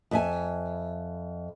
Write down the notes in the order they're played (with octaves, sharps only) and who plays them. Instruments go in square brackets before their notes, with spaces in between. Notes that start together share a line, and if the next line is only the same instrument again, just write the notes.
[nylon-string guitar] F2 E5 G#5